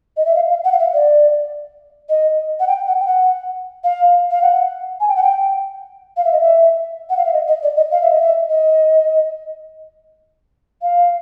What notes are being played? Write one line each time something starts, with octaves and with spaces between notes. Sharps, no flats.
D#5
E5
F5
F5
F#5
F5
E5
D5
D#5
F#5
G5
F#5
G5
F#5
F5
F5
F#5
G#5
G5
F#5
G5
F5
E5
D#5
E5
F#5
F5
E5
D#5
D#5
D5
D#5
F5
E5
D#5
E5
D#5
F5